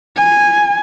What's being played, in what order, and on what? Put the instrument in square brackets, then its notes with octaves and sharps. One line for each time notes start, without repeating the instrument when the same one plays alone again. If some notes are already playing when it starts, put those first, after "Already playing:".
[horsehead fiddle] G#5